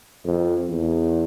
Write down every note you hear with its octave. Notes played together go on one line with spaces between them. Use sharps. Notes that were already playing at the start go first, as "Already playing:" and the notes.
F2
E2